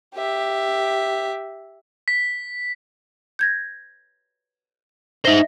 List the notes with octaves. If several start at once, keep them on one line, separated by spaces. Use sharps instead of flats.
G4 E5
B6
G6 G#6 A#6
D#4 C5 D#5 E5 A#6